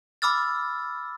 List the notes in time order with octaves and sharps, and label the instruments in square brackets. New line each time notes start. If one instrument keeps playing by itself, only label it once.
[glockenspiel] B5 D6 E6 F6 A6